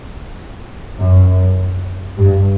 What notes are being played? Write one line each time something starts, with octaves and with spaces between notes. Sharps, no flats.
F#2
G2